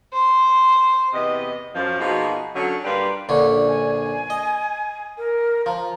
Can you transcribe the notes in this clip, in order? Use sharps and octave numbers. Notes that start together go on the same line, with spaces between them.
C5
E2 C3 B3 D#5
F#2 F3
B2 F3 A#3 D#4 F#4 G#4
D3 F#3 C#4
G2 G3 A#3 F4 B4 D5
A#1 D3 C#4
G#5
D#5
A#4
F3 A#5